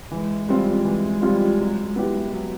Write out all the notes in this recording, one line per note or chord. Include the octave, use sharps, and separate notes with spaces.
E3 G#3
G3 C4 F4
E3
G3 C4 F4
F#3
B3 E4 G4
F#3